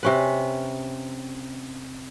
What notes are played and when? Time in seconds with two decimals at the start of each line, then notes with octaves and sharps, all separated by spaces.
0.03 C3 C#4 B4